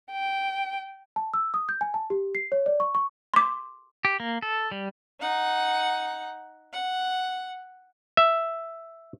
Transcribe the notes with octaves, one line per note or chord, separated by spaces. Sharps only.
G5
A5
E6
D#6
G6
G#5
A5
G4
C7
C#5
D5
C#6
C#6
C6 D6
G4
A#3
A4
G3
D#4 F#5
F#5
E5